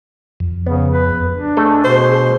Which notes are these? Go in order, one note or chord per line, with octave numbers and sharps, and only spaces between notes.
F2
C#3 B3
B4
D4
A3 G#4 A4 D#5
B2 C5